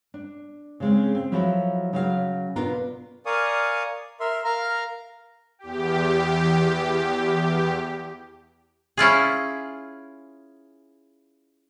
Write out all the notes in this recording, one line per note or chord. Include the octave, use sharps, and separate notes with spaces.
D4
C#3 G#3 C4
C4
F3 F#3 E4 F#4 A4
C#3 F#3 F5
B2 B3 D4 F4 A#4
A#4 D5 F5 G#5 C#6 D#6
A#4 E5 C6
A#4 F5 A#5 F6
E2 G4
C#4 E4 F4 G#4